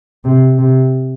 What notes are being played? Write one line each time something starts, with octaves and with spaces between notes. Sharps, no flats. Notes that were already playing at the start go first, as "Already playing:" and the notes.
C3
C3